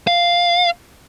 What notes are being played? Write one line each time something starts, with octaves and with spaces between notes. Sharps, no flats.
F5